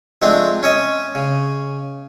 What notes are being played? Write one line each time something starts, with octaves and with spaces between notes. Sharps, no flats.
F3 G#3 A3 C4 D4
C#4 C#5 D#5
C#3